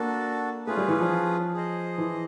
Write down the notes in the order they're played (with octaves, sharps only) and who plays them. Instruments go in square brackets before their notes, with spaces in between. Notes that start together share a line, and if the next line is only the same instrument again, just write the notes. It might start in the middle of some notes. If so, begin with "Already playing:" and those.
Already playing: [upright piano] A#3 [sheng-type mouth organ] D4 F#4 A4
[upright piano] A3 [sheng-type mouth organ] C#4 F4 G#4 B4
[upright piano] G3
E3
F3
[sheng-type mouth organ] G#4 C5 D#5
[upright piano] E3